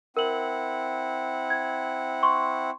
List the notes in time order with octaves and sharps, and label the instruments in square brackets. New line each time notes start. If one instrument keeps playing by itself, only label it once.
[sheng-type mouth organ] C4 E4 F#5 [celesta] A#4 F#7
[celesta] G#6
C6 C#6